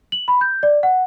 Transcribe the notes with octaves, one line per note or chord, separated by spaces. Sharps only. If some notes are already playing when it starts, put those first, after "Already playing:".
F#7
B5
G6
D5
F#5